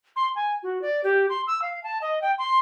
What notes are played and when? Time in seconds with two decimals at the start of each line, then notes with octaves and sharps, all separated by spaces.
0.16 C6
0.35 G#5
0.63 F#4
0.82 D5
1.04 G4
1.30 C6
1.47 E6
1.62 F5
1.84 A5
2.02 D#5
2.22 G5
2.39 C6